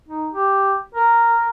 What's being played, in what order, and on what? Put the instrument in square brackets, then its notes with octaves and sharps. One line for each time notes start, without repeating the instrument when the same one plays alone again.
[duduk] D#4
G4
A#4